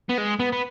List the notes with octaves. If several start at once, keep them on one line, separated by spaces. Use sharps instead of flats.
B3
G#3
B3
B3